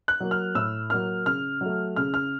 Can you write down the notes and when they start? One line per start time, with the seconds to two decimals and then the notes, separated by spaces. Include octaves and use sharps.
0.08 F#6
0.20 F#3 A#3
0.31 F6
0.55 A2 E6
0.90 F#3 A#3 F6
1.26 C#3 F6
1.61 F#3 A3
1.96 C#3 F6
2.14 F6